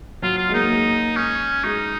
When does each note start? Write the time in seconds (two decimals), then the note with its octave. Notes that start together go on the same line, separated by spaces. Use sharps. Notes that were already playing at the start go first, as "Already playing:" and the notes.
0.22 F#3 F4
0.38 F4
0.49 G#3
0.53 A#3 D#4
0.70 G#3
1.16 C#4
1.64 G#3 D#4